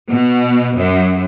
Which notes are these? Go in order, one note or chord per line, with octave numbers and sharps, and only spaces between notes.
B2
F#2